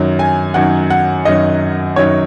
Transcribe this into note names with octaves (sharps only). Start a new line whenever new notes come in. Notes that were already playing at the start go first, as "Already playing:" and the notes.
Already playing: F#2 D#3 F#3
G#5
F#2 D#3 F#3 F#5
F#5
F#2 D#3 F#3 D#5
F#2 D#3 F#3 C#5